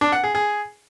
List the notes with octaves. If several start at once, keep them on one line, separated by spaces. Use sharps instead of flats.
D4
F#5
G#4
G#4